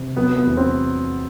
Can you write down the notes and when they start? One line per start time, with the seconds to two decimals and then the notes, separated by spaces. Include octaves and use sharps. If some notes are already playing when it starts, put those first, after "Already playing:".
Already playing: C3
0.17 F#3 B3
0.36 B3
0.47 E2
0.57 C4